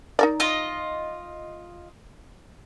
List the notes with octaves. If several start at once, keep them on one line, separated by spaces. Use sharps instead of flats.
D#4 A#4 D5
F4 D#5